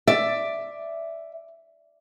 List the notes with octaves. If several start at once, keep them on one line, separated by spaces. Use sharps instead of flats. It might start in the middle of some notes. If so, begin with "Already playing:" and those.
D5 E5